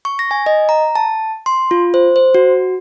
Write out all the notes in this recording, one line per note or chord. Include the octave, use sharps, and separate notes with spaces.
C#6
A#6
G#5
D#5
A#5
A5
C6
F4
C5
C5
F#4